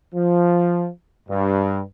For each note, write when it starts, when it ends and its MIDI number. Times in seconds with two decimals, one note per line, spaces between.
0.14 0.89 53
1.29 1.81 43